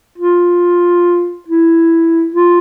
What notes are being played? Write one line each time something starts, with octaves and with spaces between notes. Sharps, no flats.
F4
E4
F4